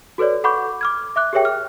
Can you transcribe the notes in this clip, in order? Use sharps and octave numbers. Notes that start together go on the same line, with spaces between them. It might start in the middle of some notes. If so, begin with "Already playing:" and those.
F#4 A4 B4 C#5 D5
A4 F#5 B5 C#6 D6 G6
D6 F6 G#6
E5 D6 F#6
G4 G#4 A#4 C#5 E5 G5
F6